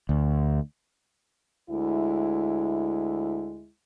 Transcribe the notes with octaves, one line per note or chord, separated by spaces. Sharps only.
D2
D2 G#3 E4